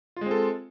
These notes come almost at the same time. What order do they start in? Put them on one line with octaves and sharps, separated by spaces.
F4 G#3 C4 A4